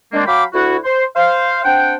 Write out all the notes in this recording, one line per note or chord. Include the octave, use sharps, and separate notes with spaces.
D#3 G#3 A#3 C4 D4
F#3 F5 G5 B5 D6
D2 E4 F#4
C5
C5 F5
C4 D4 F#5 G5